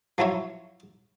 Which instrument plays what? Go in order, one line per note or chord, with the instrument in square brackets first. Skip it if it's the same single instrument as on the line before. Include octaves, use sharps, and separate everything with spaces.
[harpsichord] F3 F#3 E4 C#5